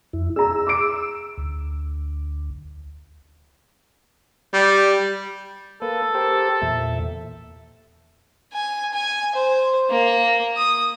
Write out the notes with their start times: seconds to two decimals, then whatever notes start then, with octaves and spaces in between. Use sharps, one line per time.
0.13 F2 E4
0.36 G#4 A#5 E6
0.67 D6 D7
1.38 D2
4.53 G3
5.82 A#3 A4 B4
6.15 G4 A#4 C5
6.62 E2 A#2 E5
8.53 G#5
8.93 G#5
9.35 C5
9.91 A#3
10.57 D#6